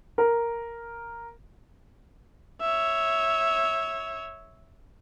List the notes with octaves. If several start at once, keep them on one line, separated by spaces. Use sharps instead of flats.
A#4
C#5 E5